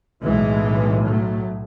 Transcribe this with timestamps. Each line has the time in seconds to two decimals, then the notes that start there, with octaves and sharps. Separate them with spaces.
0.23 B1 A2 E3 G#3
1.05 F#3 A3